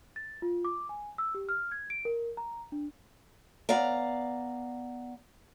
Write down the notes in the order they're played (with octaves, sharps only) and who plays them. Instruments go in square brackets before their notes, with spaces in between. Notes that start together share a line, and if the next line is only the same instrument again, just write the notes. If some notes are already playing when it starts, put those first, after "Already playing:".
[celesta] A6
F4
D6
G#5
E6
G4
F6
G#6
D7
A#4
A#5
D4
[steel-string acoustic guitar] B3 D5 F5 A#5